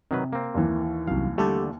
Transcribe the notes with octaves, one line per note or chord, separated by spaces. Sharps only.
C3 D#3 F#3 B4
A#3 C4
D#2 E3
C2 F#2 F5
D3 G3 A3 G4 A4